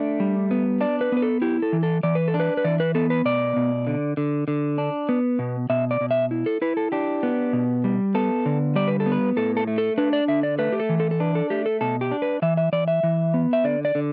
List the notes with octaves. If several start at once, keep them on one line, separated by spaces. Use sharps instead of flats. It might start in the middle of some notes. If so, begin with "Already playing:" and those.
Already playing: A3 D4 D5
G3
B3
D4 D5
B4
B3 B4
A4
E4 G4
A4
E3
A4
E3 D5
B4
A4
D4
B4
B4
E3 D5
B4
B3 A4
B4
B2 D5
B2
D3
D3
D3
D4
B3
B2
B2 E5
D5
B2
E5
E4
A4
E4 B4
A4
D4 G4
B3
B2
G3
B3 A4
D3
G3 D5
B4
A4
B3
B4
A2 A4
A4
A3
A4
D4 B4
D5
D3 E5
D5
A3 B4
G4
A4
E3
A4
A4
D4 B4
A4
A3 G4
A4
B2 A4
G4
D4
B4
E3 E5
E5
E3 D5
E5
E3
B3
E5
D3 D5
D5
D3